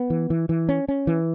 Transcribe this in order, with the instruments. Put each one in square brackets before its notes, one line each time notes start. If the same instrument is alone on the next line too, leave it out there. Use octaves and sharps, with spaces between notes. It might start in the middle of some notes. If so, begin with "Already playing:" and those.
Already playing: [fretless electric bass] B3
E3
E3
E3
C#4
C#4
E3